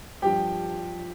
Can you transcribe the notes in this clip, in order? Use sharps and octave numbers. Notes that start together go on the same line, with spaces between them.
G2 F3 G4 G5